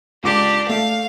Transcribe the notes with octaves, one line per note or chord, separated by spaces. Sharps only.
C#2 D4 G4 D6
A3 F5